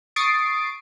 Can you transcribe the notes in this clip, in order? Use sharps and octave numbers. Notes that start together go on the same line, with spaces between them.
C#6 D#6 A6 C7 D7